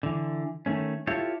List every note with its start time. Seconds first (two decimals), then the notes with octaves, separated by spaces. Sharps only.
0.03 D3 E3
0.66 D#3 A3 C#4
1.07 E4 F4 G4 A4 C#5